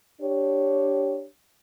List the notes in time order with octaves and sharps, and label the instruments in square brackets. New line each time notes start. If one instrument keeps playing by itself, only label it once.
[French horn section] D4 G4 C#5